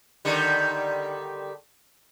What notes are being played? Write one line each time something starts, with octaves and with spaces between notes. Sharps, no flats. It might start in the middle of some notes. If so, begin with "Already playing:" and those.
D3 D#3 G3